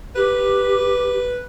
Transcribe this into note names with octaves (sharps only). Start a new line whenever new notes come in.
G4 B4